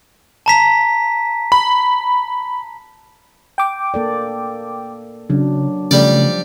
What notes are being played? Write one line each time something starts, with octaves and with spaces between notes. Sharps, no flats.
A5 A#5 B6
B5
G5 D6
A#3 A4 D5
C#3 F#3 D4
C#3 F3 G3 A3 D5